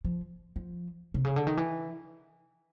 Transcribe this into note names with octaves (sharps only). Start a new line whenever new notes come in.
F3
F3
C3
C#3
D3
D#3
E3